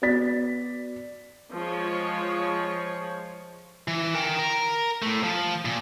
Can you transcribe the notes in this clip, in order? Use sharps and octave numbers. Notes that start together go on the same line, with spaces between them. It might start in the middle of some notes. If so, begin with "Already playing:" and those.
B3 F#4 D5 A6 B6
F3 G#3 C#5
E3
A#4 G5
A#4
A2 A3
F3
A#2